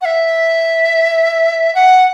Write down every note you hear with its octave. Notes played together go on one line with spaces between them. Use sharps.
F#5
E5
F#5